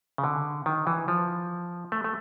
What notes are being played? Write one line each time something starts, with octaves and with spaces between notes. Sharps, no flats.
C#3
D3
D#3
E3
F3
A3
A3